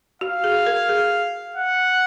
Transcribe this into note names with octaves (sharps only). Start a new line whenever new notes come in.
F#4 F5
G#4
A#4
G#4
F#5